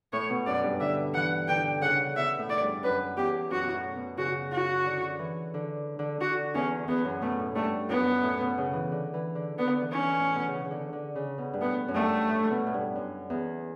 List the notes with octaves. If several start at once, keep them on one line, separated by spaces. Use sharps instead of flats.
A2 C#5
B2
F#2 D5
G2
D3 E5
E3 F#5
D3 G5
C#3 F#5
B2 E5
A2
D5
G2
F#2 B4
E2 G4
F#2 F#4
B2
A2
B2
C#3 F#4
F#4
D3
E3
D3
D3
D3 F#4
E2 C#4
E2 B3
F#2
B2 A3
A2
G2 A3
F#2 B3
A2
B2
C#3
E3
D3
E3
D3
D3 B3
E3
C#4
E3
A2
B2
C#3
C#3
D3
D3
C#3
B2
G2
A2 B3
F#2
G2 A3
A2
B2
A2
G2
F#2
E2